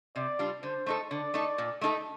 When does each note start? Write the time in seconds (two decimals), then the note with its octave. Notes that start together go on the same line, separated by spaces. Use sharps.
0.15 C3 D5
0.39 G3 D4 F4
0.63 D3 C5
0.86 A3 D#4 A4
1.10 D3 D5
1.34 A3 D#4 A4
1.58 A#2
1.81 A3 D#4 A4